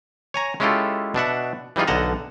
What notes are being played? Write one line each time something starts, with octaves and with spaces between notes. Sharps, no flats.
C#5 G#5 A#5
G#3 C#4 E4 F4 G4 A4
B2 D4 E5 F#5
E3 G3 D#4 F4 G#4
B1 D3 D#5 F#5 A5 A#5